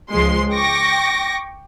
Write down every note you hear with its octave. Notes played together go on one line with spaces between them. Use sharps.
C#2 F3 G#3 C6
G5 C#6 D6 A#6